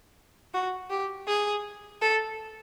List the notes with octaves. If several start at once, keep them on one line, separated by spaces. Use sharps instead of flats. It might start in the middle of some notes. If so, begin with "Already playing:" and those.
F#4
G4
G#4
A4